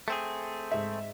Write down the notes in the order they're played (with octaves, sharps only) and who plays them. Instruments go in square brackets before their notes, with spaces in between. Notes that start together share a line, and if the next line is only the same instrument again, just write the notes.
[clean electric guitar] A3 C4 G#4
[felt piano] G#2 E5